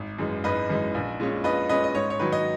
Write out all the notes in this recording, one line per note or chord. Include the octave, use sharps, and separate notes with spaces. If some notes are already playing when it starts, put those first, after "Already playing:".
Already playing: G#1
F#2 E3 G#3
G#1 B4 D#5
F#2 E3 G#3
A#1
A#2 G#3 C#4
A#1 B4 D#5
A#2 G#3 C#4 B4 D#5
D#5
G#2 C#5
C#5
D#3 F#3 B4
D#5